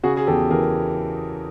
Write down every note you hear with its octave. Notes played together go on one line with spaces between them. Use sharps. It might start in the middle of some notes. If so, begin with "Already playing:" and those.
C#3 F#4 G#4
G#4
E2 G4 A4
E3 G#4 A#4